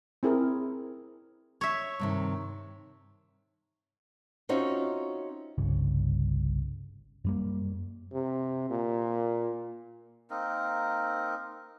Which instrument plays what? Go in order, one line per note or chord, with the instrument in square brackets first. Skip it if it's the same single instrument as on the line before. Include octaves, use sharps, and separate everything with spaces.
[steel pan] C4 E4 G#4 A#4
[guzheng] C#5 E5
[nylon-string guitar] G2 C3 D#3
C4 C#4 D#4 F4 F#4 E5
[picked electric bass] G1 C2 G2 C#3
F#2 G3 A#3
[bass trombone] C3
A#2
[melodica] A#3 C4 D#4 A#4